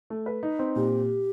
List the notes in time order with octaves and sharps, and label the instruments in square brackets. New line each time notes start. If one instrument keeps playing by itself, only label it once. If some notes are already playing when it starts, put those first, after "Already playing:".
[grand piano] A3
B4
D#4
C4
[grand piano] A#2 [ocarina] G4